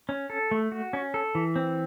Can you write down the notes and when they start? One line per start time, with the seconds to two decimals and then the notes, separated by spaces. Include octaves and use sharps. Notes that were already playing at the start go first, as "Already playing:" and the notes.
0.09 C#4
0.30 A4
0.51 A3
0.72 F#4
0.93 C#4
1.14 A4
1.35 E3
1.56 C4